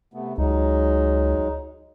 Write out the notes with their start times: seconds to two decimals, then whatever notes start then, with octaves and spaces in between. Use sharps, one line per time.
0.14 C3 A3 B3
0.38 C#2 F#3 G#3 D#4